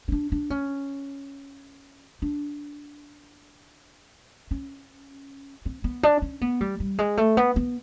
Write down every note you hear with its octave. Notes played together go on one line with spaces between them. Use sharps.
C#4
D4
D4
C#4
D4
C#4
C4
B3
D4
C#4
B3
G3
G3
G#3
A3
B3
B3